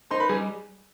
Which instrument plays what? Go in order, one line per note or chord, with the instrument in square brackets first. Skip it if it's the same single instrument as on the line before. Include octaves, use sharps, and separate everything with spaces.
[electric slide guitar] D#4 [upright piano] C5 C6
[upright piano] B4 B5
[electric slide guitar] G3 [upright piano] G#4 G#5